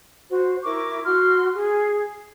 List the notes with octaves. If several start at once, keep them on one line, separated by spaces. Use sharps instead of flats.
F#4 C5
E4 A#4 C#6 D6
F#4 C6 F6
G#4